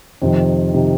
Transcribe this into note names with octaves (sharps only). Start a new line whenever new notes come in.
F2 C3 D#3
C3 D#3